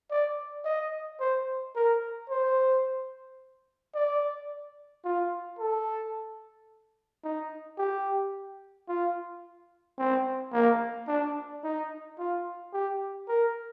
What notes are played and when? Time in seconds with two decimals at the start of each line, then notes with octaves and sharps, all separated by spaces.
0.11 D5
0.65 D#5
1.20 C5
1.75 A#4
2.30 C5
3.95 D5
5.05 F4
5.59 A4
7.24 D#4
7.78 G4
8.89 F4
9.99 C4
10.53 A#3
11.08 D4
11.64 D#4
12.19 F4
12.73 G4
13.28 A#4